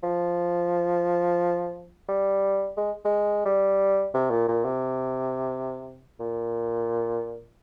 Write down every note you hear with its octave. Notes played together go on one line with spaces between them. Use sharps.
F3
G3
G#3
G#3
G3
C3
A#2
A#2
C3
A#2